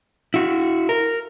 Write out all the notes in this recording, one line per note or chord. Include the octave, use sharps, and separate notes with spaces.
E4 F#4
A#4